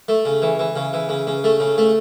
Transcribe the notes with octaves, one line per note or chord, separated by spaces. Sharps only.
A3
C#3
E3
E3
C#3
E3
C#3
C#3
A3
C#3
A3